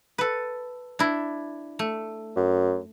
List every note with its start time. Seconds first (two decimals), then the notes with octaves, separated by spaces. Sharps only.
0.18 A4 B4
0.99 D4 E4
1.79 A3
2.36 F#2